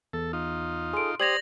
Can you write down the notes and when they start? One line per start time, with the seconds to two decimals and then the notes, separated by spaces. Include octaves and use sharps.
0.13 E2 A4
0.33 D#4 F4
0.93 G#4 A4 C6 D7
1.20 G4 C5 D5 D#6 G#6 A#6 F7 F#7